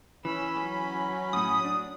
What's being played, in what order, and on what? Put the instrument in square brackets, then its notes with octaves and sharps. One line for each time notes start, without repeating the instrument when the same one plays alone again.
[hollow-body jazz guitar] E3 [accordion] C#4 B5 [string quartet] E6
[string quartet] F#3
[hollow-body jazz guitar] F#2 A2 [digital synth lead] D#6
[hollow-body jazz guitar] D4